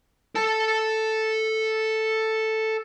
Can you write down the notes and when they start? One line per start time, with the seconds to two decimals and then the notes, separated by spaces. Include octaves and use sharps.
0.35 A4 A5